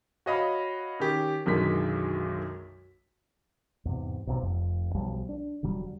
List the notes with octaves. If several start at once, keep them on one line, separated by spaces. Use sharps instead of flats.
F#4 C#5 D#5 F5 B5
D#3 C#4 G4
B1 F#2 D3 D#3 G#3 B6
E2 G#2 C3
B1 C3
F1 F2
B1 F3 G3
D4
E1 D3 F#3 G3